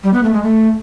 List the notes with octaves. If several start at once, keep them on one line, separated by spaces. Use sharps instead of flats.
G3
B3
A3
G#3
A3